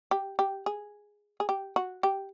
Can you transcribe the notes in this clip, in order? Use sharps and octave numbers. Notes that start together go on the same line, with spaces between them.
G4
G4
G#4
G#4
G4
F#4
G4